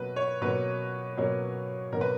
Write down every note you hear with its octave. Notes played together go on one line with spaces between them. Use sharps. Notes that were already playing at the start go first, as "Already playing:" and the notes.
Already playing: B2 F#3 A#3 C#4 B4
C#5
B2 F#3 A#3 C#4 B4
B2 F#3 A#3 C#4
B2 F#3 A#3 C#4 A#4
B4